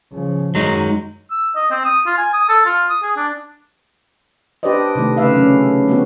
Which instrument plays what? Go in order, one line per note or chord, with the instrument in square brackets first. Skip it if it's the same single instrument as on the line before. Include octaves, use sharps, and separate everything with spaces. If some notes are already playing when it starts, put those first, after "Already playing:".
[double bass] C#3 F3
[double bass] F#2 D#3 [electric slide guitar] F#3 G#3 D#4
[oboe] E6
D#5
C4
D#6
F4
G#5
D#6
A4
F4
D#6
G#4
D4
[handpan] D4 G4 B4 C5 D5 D#5
C3 D#3 A3
C#3 A3 B4 E5 F5
F#3 C#4
D3 F3 G#3 B3 C4 F#4